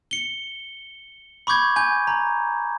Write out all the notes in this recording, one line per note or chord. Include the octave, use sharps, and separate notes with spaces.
C#7 G7
B5 C#6 D6 G6 G#6
G#5 G6
A#5